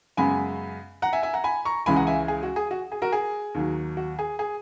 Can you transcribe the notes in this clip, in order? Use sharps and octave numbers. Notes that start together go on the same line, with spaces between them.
F#2 C#3 G#3 B3 G#5 B5
F#5 A#5
E5 G#5
E5 G#5
F#5 A#5
G#5 B5
A#5 C#6
C#2 C#3 E3 G#3 C#4 G#5 B5
F#5 A#5
E5 G#5
G#4
F#4
G#4
F#4
G#4
F#4 A#4
G#4
D#2 D#3 F#3
F#4
G#4
G#4